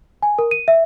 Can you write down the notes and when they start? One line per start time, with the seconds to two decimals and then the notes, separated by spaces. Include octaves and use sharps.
0.22 G#5
0.39 A#4
0.51 D#7
0.68 E5